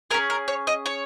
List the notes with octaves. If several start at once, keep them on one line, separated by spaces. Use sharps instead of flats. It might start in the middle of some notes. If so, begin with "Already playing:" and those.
C#4 G#4 A#4
A#4
C#5
D#5
C#5